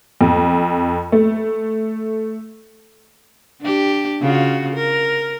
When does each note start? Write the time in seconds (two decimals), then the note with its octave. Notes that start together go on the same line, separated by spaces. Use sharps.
0.21 F2
1.12 A3
3.61 D4 G4
4.21 C#3 F4 F#4
4.74 A#4